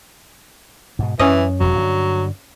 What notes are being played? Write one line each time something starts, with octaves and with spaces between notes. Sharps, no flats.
G#2 B2
F#2 E3 C#4 D#5
E1 F2 F#3
G2 D3